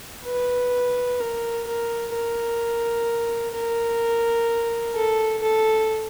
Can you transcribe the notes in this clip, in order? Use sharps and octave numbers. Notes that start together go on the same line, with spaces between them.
B4
A#4
A#4
A#4
A#4
A4
A4